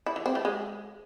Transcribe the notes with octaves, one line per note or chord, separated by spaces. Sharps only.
E4
E3
C4
A3
G#3